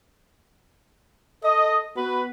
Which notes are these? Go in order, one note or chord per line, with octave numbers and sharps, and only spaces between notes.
A4 D#5
B3 F#4 B4